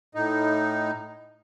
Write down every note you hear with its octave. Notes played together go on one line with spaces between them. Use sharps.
A2 D#4